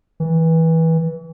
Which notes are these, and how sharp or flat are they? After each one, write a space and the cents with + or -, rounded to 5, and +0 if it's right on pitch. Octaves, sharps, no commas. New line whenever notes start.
E3 -20